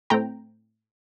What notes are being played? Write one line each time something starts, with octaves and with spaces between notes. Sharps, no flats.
A2 A3 C4 G5 A#5